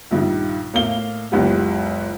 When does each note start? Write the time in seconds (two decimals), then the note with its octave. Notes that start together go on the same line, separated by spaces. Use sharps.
0.11 A#1 G2 D#3
0.74 A2 A#3 F5 G7
1.32 F#1 C#2 B3 G4